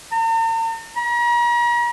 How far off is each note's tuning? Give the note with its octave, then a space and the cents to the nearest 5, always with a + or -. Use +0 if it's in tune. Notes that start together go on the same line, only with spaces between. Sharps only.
A#5 -45
A#5 +40